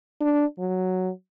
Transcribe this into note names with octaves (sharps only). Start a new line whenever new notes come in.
D4
F#3